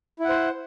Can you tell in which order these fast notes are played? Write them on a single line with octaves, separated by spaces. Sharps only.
E4 F#5 C5